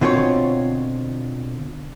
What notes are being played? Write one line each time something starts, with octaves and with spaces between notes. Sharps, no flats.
B2 D3 C4 F4 G4 C#5